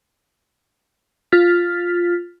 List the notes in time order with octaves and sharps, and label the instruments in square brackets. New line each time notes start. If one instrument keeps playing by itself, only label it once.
[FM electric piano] F4 F6 A6 B6